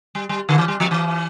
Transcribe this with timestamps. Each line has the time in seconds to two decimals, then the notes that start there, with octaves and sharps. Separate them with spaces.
0.15 G3
0.29 G3
0.49 D3
0.58 E3
0.68 G3
0.80 F3
0.91 E3